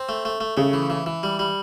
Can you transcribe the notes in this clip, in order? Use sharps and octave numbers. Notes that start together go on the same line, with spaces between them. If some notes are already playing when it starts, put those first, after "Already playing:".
Already playing: C4
A3
A3
A3
C#3 A3
E3
E3
E3
G3
G3